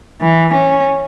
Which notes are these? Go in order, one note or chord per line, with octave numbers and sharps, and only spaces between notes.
E3
C#4